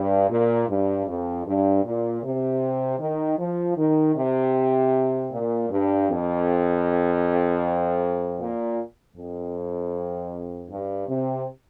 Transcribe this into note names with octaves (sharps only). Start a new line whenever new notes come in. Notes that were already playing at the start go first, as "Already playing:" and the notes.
Already playing: G2
A#2
G2
F2
G2
A#2
C3
D#3
F3
D#3
C3
A#2
G2
F2
A#2
F2
G2
C3